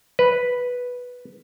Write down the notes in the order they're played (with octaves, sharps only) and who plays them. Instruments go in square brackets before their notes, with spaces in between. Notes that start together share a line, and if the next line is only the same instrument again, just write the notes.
[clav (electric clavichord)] B4